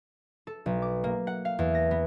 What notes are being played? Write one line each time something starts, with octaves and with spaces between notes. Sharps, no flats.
A4
B1
D6
A#3
F#5
F5
E2
A#6
B3